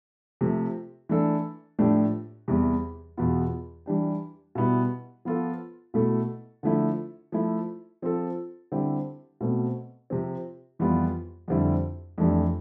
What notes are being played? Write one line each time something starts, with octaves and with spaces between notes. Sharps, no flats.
C3 F3 A3
E3 A3 D4 A4
A2 F3 A3 D4 G4
E2 C3 E3 G3
E2 B2 B3 F4
E3 G3 D4 G4
B2 G3 B3 E4
F3 B3 F4 A4
B2 A3 E4 A4
D3 F3 A3 E4
F3 A3 E4
F3 C4 F4 A4
D3 G3 C4 E4 G4
B2 A3 C4
C3 F3 C4
F2 E3 G3 B3 F4
F2 D3 G3 C4 E4
F2 E3 A3 D4 G4